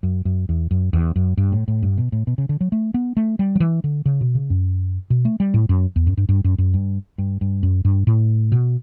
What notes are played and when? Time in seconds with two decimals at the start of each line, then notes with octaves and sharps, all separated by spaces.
0.03 F#2
0.25 F#2
0.49 E2
0.71 F#2
0.93 E2
1.16 F#2
1.37 G2
1.52 A2
1.68 A2
1.83 G2
1.98 B2
2.12 A2
2.27 B2
2.38 C#3
2.49 D3
2.61 F#3
2.72 A3
2.94 B3
3.17 A3
3.39 G3
3.55 F#3
3.60 E3
3.84 D3
4.06 C#3
4.21 B2
4.35 C#3
4.50 F#2
5.10 B2
5.25 A3
5.40 G3
5.54 A2
5.69 F#2
5.96 E2
6.07 F#2
6.17 G2
6.29 G2
6.44 F#2
6.58 F#2
6.74 G2
7.18 G2
7.41 G2
7.63 F#2
7.85 G2
8.07 A2
8.52 B2